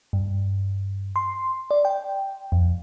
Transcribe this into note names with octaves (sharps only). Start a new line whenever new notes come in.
G2
C6
D5
G5
F2